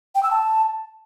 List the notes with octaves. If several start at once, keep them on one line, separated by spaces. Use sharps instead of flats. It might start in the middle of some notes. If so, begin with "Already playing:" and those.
G5
E6
A5